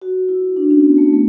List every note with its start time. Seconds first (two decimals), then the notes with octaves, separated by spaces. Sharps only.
0.02 F#4
0.29 E4
0.57 D4
0.70 C#4
0.84 B3
0.98 A3
1.13 A3